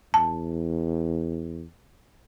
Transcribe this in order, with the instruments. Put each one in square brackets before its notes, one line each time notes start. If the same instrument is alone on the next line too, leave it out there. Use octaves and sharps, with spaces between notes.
[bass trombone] E2 [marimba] A5